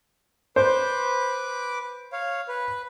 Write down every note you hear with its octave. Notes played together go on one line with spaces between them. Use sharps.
B4 C5 D6
C#5 F5
B4